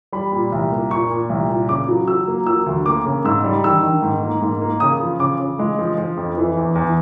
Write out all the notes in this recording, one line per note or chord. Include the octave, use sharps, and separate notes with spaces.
G3 B5
A#2
C2
A#3
A#2 C#6
A#2
C2
A#2
C#3 D6
F#3
F#3 E6
A#3
F#3 E6
D2
A#3 D6
C#3
G#2 E6
G3
D#3 E6
D#3
G#2
A#3
G#2
A#3
C#3 D#6
F3
C#3 D6
C#3
G#3
F3
F3
F2
E3
E2
E2